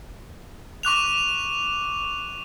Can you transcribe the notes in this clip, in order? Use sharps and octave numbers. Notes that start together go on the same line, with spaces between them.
C#6 D6 F#6 F7